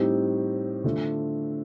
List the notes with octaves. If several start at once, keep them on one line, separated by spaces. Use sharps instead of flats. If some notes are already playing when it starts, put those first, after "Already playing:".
Already playing: A2 G3 C4 D#4 G4
D3 A3 D4 F4